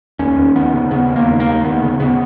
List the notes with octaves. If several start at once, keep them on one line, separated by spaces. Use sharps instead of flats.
D#2 C#4
D#2
D#2 B3
C#3
C#3 B3
D#2
A#3
D#2
A#3
D#2
D#2 B3
C#3
C#3 B3